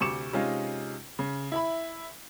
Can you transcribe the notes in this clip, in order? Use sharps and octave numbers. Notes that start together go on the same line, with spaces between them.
D2 C3 C#6 D6 C#7 E7
C3 G#3 C#4 D#4 F4
C#3
E4 E5 B5